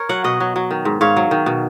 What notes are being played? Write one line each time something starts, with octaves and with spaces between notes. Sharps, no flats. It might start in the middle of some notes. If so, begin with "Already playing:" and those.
Already playing: A#4 C#5
F#3 F#5
B2 D#5 F#5
F#3
F#3
D#3
G#2
G#2 C#5 F5
F#3
D#3
B2